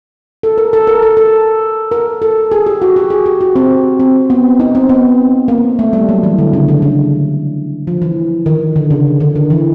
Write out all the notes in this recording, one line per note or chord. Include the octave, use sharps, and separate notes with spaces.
A4
A#4
A4
A#4
A4
A4
A#4
A4
G#4
G4
F#4
G4
G#4
G4
F#4
C4
C4
B3
D#4
C4
B3
A#3
A3
G3
F#3
E3
D3
C#3
D3
C#3
F3
E3
D#3
D3
C#3
D3
D#3
E3